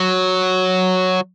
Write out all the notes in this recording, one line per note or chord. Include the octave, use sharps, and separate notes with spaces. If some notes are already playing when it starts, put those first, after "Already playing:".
Already playing: F#3